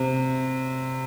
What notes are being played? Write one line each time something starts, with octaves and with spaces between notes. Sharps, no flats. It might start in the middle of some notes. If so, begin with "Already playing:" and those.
Already playing: C3